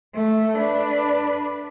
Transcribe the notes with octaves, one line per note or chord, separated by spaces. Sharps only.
A3
D4 B4